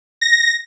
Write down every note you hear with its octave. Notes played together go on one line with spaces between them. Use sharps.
A#6